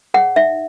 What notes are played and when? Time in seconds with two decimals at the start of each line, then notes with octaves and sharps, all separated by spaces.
0.14 G#4 F#5
0.17 C#5
0.36 D#4 E5